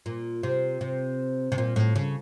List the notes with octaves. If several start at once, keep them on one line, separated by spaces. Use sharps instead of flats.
A#2
C3
C3
C3
A#2
A2
C#3